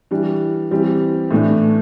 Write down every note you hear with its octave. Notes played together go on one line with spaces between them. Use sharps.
E3 G3 D4
E3 G3 C4 G4
A2 E3 A3 D4